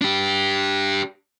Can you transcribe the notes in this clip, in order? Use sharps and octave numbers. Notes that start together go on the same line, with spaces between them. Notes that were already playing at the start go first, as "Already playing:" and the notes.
D4 G4